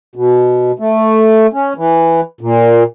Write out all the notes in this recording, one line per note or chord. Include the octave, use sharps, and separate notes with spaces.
B2
A3
C#4
E3
A#2